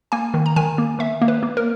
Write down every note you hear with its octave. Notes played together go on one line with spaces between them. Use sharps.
A#3 G#5
D#3
A#5
D#3 G#5
A#3
D#3 E5
A#3
B4
A#3
A#4